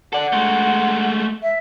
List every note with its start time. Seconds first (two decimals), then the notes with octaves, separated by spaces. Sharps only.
0.13 A4 D5 F#5
0.33 G#3 A3
1.43 E5